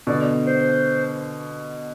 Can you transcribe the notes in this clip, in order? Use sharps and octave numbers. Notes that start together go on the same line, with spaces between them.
B2 D3 D5
C5